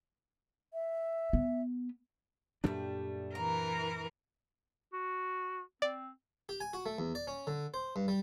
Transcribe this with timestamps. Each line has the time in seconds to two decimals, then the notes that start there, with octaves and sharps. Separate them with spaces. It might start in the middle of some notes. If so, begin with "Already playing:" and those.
0.74 E5
1.33 B3
2.64 F#2 A#2 G3 A3 D4
3.35 E3 A#4 A#5
4.93 F#4
5.82 C4 D5
6.49 G4
6.61 G#5
6.73 F#4
6.86 A3
6.99 E2
7.15 D5
7.27 C#4
7.47 D3
7.74 C5
7.96 G2
8.08 G3